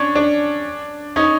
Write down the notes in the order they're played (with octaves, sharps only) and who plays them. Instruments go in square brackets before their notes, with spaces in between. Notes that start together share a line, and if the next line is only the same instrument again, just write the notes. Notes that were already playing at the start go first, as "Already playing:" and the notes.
Already playing: [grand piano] C#4 D4
D4
C#4 D#4